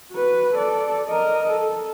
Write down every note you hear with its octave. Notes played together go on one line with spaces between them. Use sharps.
F#4 B4
A4 D5
A#4 D#5
A4